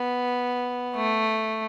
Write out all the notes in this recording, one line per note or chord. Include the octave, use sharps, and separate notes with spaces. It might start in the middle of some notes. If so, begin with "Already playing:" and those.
Already playing: B3
A3